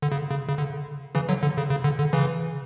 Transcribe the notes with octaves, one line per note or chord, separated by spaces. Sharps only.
D3
C#3
C#3
C#3
D3
C#3 E3
D3 F#3
D3
C#3
C#3
D3
D3
C#3 E3